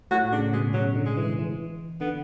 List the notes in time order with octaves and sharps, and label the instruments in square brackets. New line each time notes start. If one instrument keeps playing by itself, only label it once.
[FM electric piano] A2 [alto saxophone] F#4
[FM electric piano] C#3 [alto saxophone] D4
[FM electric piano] B2 [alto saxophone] G#3
[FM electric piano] C#3 [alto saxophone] F#3
[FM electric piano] D3
[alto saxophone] G#3
[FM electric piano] E3
D3
E3
[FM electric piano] D3 [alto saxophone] B3